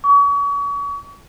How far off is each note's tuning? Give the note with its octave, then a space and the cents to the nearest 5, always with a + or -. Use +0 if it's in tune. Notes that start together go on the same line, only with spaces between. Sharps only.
C#6 +40